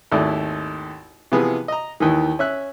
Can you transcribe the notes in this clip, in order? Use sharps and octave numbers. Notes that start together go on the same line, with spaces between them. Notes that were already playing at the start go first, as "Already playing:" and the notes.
G#1 D#2 A3 E4 D5
C3 E3 F3 B3 G#4
D#5 A#5
D#2 D#3 E3
C#4 E5 F#6